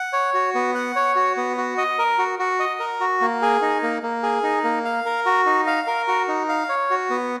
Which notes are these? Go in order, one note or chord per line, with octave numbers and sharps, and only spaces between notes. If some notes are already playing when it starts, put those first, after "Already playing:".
Already playing: F#5
C#5
F#4
B3
F#5
C#5
F#4
B3
F#4
D#5
A#4
F#4
F#4
D#5
A#4
F#4
A#3
G#4
D#4
A#3
A#3
G#4
D#4
A#3
F5
A#4
F#4
D#4
F5
A#4
F#4
D#4
F5
C#5
F#4
B3